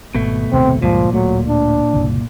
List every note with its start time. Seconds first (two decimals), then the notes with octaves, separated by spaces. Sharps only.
0.15 G#1 B2 A3
0.52 A1 D#2 C3 C4
0.82 C#2 G2 A#2 F3 G#3
1.13 D1 F#3 A3
1.48 D4
1.94 F#1 C2